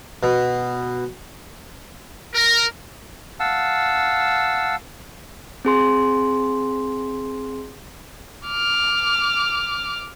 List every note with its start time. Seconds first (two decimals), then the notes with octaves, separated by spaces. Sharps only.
0.23 B2
2.35 A#4
3.40 F5 F#5 A5 E6
5.65 C4 G#4 C6
8.48 D6 F6